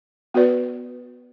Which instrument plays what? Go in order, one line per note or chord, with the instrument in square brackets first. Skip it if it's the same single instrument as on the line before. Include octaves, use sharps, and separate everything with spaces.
[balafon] B3 F#4 B4 D5